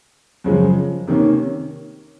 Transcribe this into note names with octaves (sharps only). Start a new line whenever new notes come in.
F#2 C#3 F3 G#3
C3 D#3 A#3 C#4